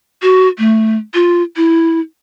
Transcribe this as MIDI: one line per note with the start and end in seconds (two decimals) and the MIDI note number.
0.22 0.48 66
0.58 0.97 57
1.14 1.42 65
1.56 2.00 64